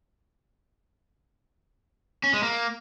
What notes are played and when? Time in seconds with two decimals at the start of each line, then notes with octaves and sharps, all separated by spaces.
2.24 C#4
2.33 G#3
2.43 A#3